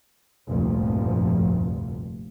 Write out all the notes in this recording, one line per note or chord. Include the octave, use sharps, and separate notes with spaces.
F1 D2 G2 A#2 F3